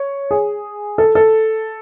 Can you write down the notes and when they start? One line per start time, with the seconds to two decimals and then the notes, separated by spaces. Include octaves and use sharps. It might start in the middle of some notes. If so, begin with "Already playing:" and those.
Already playing: C#5
0.31 G#4
0.98 A4
1.15 A4